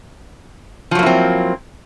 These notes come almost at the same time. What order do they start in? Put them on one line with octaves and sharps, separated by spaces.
F3 F#3 A#3 E4 C4